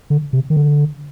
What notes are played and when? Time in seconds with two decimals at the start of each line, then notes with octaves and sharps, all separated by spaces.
0.10 D3
0.33 C3
0.50 D#3
0.57 D3